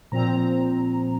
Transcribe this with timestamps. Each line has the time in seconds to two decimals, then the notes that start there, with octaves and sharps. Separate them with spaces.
0.12 A#2 F3 C4 A#5